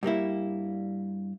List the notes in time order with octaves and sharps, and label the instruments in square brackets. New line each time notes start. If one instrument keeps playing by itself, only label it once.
[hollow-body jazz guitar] G2 G3 A#3 E4